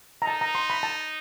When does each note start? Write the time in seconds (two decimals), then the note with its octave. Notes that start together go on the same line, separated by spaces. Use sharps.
0.22 A#5
0.27 D#4 A5
0.41 A#5
0.55 C6
0.70 B5
0.83 A5